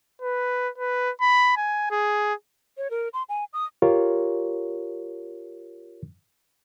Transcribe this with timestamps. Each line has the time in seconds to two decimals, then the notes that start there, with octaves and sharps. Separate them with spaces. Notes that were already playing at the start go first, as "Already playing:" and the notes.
0.22 B4
0.78 B4
1.21 B5
1.57 G#5
1.91 G#4
2.78 C#5
2.91 A#4
3.13 C6
3.29 G#5
3.53 D#6
3.82 F4 G4 A#4 C#5